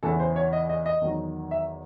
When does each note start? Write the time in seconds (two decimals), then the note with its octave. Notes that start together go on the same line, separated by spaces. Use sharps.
0.03 E2 C#3 E3 A4
0.20 C5
0.36 C#5
0.53 D#5
0.69 D#5
0.86 D#5
1.01 E2 D#3 F#3
1.51 E5